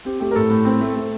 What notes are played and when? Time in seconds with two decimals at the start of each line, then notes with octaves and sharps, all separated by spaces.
0.05 C4 G4
0.20 A3 G4
0.31 A#4
0.36 A2 A4
0.50 A2
0.65 C4
0.81 A3
0.96 A3